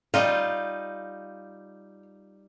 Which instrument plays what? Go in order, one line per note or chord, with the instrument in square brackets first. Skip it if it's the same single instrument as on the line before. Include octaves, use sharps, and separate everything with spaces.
[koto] G3 D#4 F4 [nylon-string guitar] F5